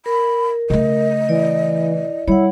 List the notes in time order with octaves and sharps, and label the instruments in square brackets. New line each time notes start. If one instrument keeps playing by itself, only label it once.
[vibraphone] A#4 [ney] B5
[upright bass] C#3 A3 [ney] D#5
[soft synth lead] E3 [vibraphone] E4 D5
[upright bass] G3 [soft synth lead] E4 [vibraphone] C#5 F#5